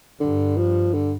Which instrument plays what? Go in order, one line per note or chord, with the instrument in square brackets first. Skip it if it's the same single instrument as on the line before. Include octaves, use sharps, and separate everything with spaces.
[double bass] G2 [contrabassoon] D3
[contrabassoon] F3
D3